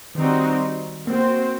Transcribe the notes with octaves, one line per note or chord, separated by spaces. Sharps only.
D#3 G3 C4 D#4 F#4
A#3 C4 F#4 C5